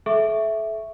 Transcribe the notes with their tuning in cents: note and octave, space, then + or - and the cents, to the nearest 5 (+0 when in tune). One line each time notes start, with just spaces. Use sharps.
A4 -40 E5 +0 C#6 +0